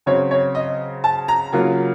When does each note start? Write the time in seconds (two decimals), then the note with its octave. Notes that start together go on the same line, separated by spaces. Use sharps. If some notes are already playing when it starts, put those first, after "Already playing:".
0.06 C#3 F#3 C4 C#5
0.31 C#5
0.55 D#5
1.04 A5
1.28 A#5
1.53 C#3 F#3 A#3 F4